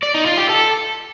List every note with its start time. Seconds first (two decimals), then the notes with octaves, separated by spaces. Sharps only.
0.03 D5
0.14 D#4
0.26 F4
0.37 G4
0.49 A4